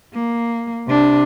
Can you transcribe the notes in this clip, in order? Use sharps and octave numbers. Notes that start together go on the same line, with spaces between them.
A#3
C3 D4